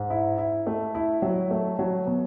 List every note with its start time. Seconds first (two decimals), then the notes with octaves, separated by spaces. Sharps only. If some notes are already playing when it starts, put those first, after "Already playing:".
Already playing: G#2
0.10 E4
0.38 E4
0.67 A3
0.95 E4
1.22 F#3
1.51 A3
1.79 F#3
2.06 B2